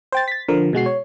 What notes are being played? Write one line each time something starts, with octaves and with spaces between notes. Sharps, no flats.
C5 G5 A6
A6 B6
D3 F3 A#4
B2 G#3 F#4 C7
C#5